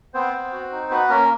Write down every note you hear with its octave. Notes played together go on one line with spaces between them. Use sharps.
B3 C4 C5
B3
F#4
D#4
B3 F#4 B4
A#3 C#4 A#4